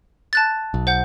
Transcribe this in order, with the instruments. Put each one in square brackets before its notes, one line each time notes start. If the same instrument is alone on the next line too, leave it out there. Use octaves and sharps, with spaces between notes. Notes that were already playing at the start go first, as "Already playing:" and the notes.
[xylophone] A5 F#6 A6
[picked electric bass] B1
[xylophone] C5 F#5 G6